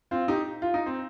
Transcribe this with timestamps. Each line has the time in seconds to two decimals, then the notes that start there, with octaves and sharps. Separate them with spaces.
0.11 C4 F4
0.28 D#4 G4
0.62 F4
0.74 D#4
0.86 C4